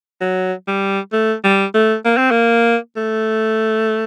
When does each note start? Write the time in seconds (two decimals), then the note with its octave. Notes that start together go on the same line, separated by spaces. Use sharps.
0.21 F#3
0.67 G3
1.13 A3
1.44 G3
1.74 A3
2.05 A#3
2.17 C4
2.31 A#3
2.96 A3